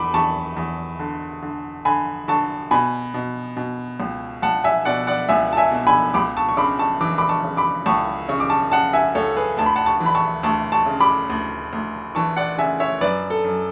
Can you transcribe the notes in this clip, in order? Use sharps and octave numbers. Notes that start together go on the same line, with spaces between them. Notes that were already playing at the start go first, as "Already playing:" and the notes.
Already playing: E2 B5 D6
E2 A5 C#6
E2
D3
D3
D3 G#5 B5
D3 A5 C#6
B2 G#5 B5
B2
B2
C#2
C#2 F#5 A5
E5 G#5
B2 D5 F#5
D5 F#5
C#2 E5 G#5
A5
E5 G#5
B2
G#5 B5
C#2 B5 D6
A5 C#6
C#6
C#3 B5 D6
A5 C#6
E3 D6
B5 D6
A5 C#6
C#3
B5 D6
C#2 A5 C#6
C#3 C#6
D6
A5 C#6
C#3 F#5 A5
E5 G#5
C#2 A4 C#5
G#4 B4
D2 A5
B5
F#5 A5
A5 C#6
E3
B5
A5 C#6
D2 A5 C#6
A5 C#6
C#3
B5 D6
D2
D2
E3 A5 C#6
D5 F#5
C#3 E5 G#5
C#5 E5
F#2 B4 D5
A4
F#2